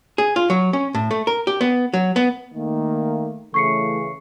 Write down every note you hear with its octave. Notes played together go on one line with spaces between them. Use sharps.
G#4
F4
F#3
C#4
A2
A3
A#4
G4
B3
F#3
B3
D#3 A3 A#3
C#3 E3 A3 C#6 C7 C#7